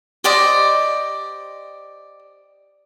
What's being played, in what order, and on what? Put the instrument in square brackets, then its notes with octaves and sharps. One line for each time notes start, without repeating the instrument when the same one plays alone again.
[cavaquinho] G4 C5 D5 D#5